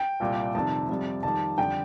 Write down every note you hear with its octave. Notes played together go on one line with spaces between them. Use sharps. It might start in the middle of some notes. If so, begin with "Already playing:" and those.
Already playing: G5
C2 A#2 G3
F2 C3 D#3 G3 A5
F2 C3 G3
F2 D#3 G3 A5
F2 D3 G3 G5